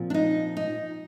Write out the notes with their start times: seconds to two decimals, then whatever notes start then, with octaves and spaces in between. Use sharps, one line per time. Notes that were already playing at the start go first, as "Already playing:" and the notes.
Already playing: A#2 F3 C4
0.10 D4
0.14 D#4
0.57 D#4